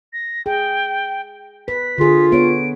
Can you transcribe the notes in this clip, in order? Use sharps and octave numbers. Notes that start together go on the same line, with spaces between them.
A#6
G#4 G5
B4 B6
D3 F4 G#4
B3 C#5 D7